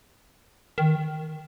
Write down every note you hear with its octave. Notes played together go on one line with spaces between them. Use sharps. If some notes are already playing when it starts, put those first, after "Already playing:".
D#3